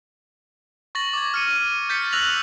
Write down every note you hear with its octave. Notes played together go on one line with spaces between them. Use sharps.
C#6 A6 A#6 F#7
D6 G#6
F6 C#7 D#7
G6 A6 B6 C#7
E6 F#6 A#6 F7 F#7